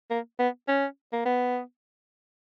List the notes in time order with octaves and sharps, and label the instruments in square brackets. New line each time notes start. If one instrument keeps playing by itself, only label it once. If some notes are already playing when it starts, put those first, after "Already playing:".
[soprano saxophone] A#3
B3
C#4
A#3
B3